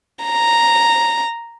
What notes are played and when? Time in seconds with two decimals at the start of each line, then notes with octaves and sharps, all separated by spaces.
0.25 A#5